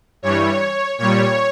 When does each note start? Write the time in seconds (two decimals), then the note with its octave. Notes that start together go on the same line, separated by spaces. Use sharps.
0.22 G2 E3 G3 C#5
0.98 A#2 G3 C#5